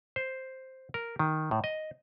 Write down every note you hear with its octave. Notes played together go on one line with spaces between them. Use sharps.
C5
A#4
D#3
A2
D#5